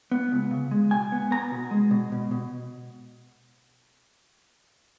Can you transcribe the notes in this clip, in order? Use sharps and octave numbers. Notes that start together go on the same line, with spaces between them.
B3
C#2
C#3
G#3
B2 G#5
B3
B3 A#5
B2
G#3
B2
B2
B2